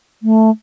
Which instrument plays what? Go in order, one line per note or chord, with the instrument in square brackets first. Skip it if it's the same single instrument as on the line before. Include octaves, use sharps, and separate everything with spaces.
[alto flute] A3